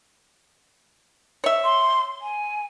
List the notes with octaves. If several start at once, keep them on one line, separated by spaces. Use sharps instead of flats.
C#5 E5
C6
G#5